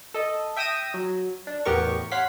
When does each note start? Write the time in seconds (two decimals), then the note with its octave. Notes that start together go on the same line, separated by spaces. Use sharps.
0.14 A4 D#5
0.56 E5 G5 D#6 E6 A#6 D#7
0.94 F#3
1.47 D4
1.65 E2 A2 B3 G4 A#4 C#6
2.12 C#5 F5 F#5 C6 B6